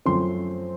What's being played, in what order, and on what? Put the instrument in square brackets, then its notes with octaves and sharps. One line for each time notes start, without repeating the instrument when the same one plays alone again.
[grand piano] F#2 F3 A3 C4 C6